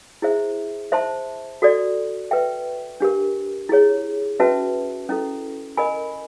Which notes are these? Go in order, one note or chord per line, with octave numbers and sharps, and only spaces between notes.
E4 G#4 C5 E5
C5 E5 A5 C6
F#4 A4 D5
B4 E5 G5
D4 G4 A#4
E4 G#4 C#5
C#4 F#4 B4 E5 A5
C#4 E4 A4
A#4 D#5 G#5 B5